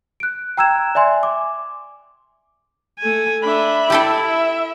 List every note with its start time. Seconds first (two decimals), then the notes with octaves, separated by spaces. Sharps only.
0.20 F#6 D7
0.57 G5 A#5 E6 F#6 G#6 E7
0.95 D5 E5 G#5 C6
1.23 D6
2.99 A3 G#5
3.42 D4 E5 B5
3.90 E4 G4 A4 G5
4.23 E5